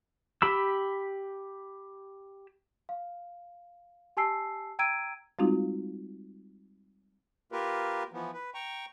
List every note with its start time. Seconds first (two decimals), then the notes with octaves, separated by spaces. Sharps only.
0.42 G4 B5 E6
2.89 F5
4.17 G4 G#5 A5 E6 C7
4.79 G5 A#5 E6 G#6 D7 D#7
5.39 G3 G#3 C4 D#4 F4 F#4
7.52 A#3 F4 G4 A#4 B4
8.13 E3 F3 B3
8.34 B4
8.54 G5 A#5 C#6